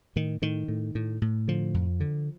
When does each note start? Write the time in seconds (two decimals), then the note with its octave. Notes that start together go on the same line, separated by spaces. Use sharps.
0.16 A2 D#3
0.42 A2 D#3
0.68 A2
0.95 A2
1.22 A2
1.48 D3 F3
1.74 F2
2.00 D3